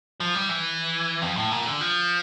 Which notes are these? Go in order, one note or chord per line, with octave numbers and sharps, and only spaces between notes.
F3
G3
E3
F2
A2
A#2
D3
F3